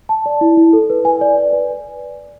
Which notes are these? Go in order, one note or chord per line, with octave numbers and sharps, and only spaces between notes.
A5
D5
E4
E4
A4
B4
G#5
D5
D5
B4